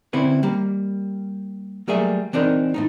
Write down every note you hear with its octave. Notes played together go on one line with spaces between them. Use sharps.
D3 C4 C#4 E4 B4
G3 A#3
F#3 G3 A3 A#3 G#4 E5
E3 C4 D4 D#4 A#4
A2 A3 D#4